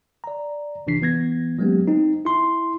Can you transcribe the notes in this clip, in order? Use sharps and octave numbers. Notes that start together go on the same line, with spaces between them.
D5 A#5
A1 C3 E3 D4 B6 C7
E3 B3 G#6 A#6
F#3 G#3 A#3 B3 C#4 G4
C4 D#4
E4 C6